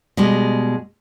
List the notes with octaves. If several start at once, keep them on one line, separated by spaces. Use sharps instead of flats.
B2 G3 G#3